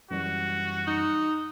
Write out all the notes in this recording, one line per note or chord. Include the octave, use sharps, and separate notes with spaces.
F#2 E3 G3 F#4
D#4